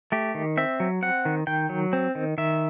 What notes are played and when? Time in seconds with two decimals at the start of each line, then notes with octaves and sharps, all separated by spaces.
0.12 A3 G4
0.35 D#3
0.57 C4 E5
0.80 F#3
1.02 C4 F#5
1.25 D#3
1.47 D#3 G5
1.69 F#3
1.93 C4
2.15 D#3
2.38 D#3 E5